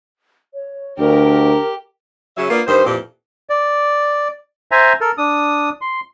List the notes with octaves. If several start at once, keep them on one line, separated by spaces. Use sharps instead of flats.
C#5
D2 D4 G4 A#4
C#3 F#3 C#4 E5
A#3 B3 D4 F4
G2 D#3 C5
F2 A#2 E3 C4 G4
D5
C5 E5 G#5 A#5
A4 A#4
D4 D#6
C6